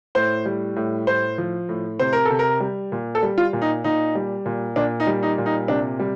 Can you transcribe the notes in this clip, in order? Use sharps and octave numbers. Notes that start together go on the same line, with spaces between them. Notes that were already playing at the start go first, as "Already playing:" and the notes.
A2 C5
G3
A2
A2 C5
F3
A2
C3 C5
A#4
C3 A4
A#4
G3
A#2
A4
G3
F4
A#2
D#4
A#2 D#4
G3
A#2
A#2 D4
D#4
G3
D#4
A#2
D#4
C3 D4
G3